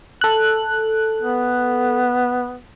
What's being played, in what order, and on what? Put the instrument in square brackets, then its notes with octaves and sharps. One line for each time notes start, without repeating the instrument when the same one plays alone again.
[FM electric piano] A4 F#6
[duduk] B3